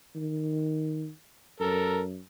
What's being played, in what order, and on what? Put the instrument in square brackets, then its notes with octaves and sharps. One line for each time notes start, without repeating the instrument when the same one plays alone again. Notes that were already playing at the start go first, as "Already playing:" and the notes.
[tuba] D#3
[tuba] F#2 [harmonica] A4 A#4